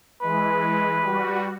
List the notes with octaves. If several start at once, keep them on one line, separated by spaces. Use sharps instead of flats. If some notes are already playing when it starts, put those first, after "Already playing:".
E3 G#3 B4
G3 F#4